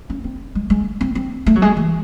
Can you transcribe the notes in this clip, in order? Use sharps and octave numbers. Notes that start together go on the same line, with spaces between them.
C#4
C4
G#3
G#3
C4
C4
A3
F#3
G#3
E3